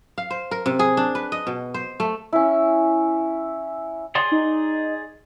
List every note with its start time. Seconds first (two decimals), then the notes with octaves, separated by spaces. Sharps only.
0.18 F5
0.30 C5
0.51 A#4
0.66 C3
0.79 G#4
0.97 D4
1.15 B4
1.32 D#5
1.47 B2
1.74 C5
2.00 A3
2.32 C#4 E4
4.15 G#4 D5 C6
4.32 D#4